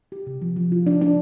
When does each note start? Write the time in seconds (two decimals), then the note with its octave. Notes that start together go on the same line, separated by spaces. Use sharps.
0.12 G4
0.27 C3
0.42 F3
0.56 F3
0.72 F4
0.87 D4
1.01 D4